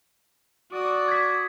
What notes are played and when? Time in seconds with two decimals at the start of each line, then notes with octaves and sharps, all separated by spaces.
0.72 F#4 D5 D6 D#6
1.08 G#6 B6